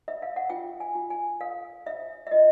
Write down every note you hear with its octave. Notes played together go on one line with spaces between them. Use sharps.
E5
F5
F#5
F4 G5
G#5
F4
G#5
A4 F5
C5 E5
E5
F4 D#5